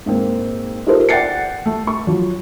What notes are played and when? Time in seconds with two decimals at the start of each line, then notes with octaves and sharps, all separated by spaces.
0.06 G#2 A#3 C4
0.86 D#4 F4 G4 A4 A#4 C5
1.09 D5 F#5 G5 A6 C7 C#7
1.66 A3
1.87 C#6
2.07 F3 F#3